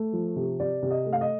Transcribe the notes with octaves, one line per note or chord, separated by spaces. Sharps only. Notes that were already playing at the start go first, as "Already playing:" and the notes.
Already playing: A3
F3
C3
C3 D5
C3
D#5
A3
F5
D#5